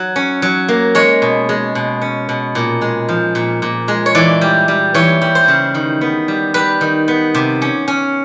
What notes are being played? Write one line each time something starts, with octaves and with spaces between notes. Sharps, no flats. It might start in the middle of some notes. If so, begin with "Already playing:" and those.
Already playing: F#3
C#4
F#3
A#3
G#3 C#5
B2
G#3
B2
C#4
B2
A#2
G#3
F3
A#2
A#2
G#3
C#5
E3 D5
G3
G3
E3 C#5
G3
C5
C#3
D#3
B3
G3
G3 B4
D#3
B3
C3
C#4
C#4